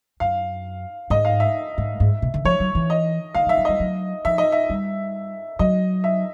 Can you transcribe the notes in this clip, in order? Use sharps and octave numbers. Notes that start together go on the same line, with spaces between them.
F#2 F5
G#2 D#5
F5
E5
G#2
G#2
B2
D3
F3 C#5
F#3
E3
D#5
D#3 F5
F3
E5
F#3
G3 D#5
F#3
F3 E5
D#5
E5
G3
F#3 D#5
E5